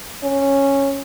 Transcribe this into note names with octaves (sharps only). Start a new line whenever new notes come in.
C#4